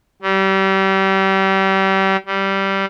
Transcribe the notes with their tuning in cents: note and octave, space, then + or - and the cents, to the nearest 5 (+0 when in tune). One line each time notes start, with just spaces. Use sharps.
G3 -30
G3 -10